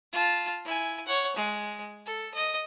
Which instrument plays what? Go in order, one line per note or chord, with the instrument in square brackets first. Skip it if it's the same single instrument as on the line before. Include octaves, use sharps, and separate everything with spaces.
[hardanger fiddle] F4 A5
E4 G#5
C#5 F#5
G#3
A4
D#5